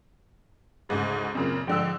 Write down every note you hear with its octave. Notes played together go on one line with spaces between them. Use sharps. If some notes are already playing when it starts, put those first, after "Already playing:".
D2 G#2 C#3
F#2 A#2 C#3 C4 A#4
G#2 D3 F3 G5 E6